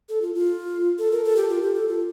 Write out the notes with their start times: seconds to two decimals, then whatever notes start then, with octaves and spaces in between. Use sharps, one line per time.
0.09 A4
0.22 F4
0.34 F4
0.98 A4
1.11 A#4
1.24 A4
1.36 G4
1.49 F4
1.62 G4
1.75 A4
1.88 F4